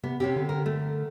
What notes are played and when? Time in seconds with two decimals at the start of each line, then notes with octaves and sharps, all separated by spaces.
0.04 C3 B3
0.20 C3 C4 C#4 G4
0.36 D3
0.49 A#4
0.66 A3